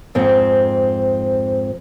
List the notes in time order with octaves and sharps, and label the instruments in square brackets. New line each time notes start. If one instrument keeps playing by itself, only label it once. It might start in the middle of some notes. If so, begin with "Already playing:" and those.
[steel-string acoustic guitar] F2 G#2 C4